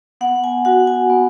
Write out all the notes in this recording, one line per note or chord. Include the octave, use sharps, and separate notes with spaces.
B3 F#5
G#5
F#4 F#5
G#5
B3